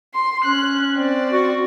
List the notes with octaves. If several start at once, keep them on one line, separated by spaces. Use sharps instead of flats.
C6
C#4 F#6
C4 D5
F#4